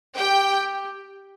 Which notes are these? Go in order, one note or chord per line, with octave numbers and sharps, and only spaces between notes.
G4 G5